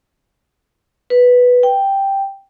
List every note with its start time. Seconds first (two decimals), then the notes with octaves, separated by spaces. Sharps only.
1.10 B4
1.63 G5